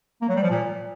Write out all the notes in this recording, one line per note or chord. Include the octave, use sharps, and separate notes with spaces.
A#3
F#3
G3
F3
A#2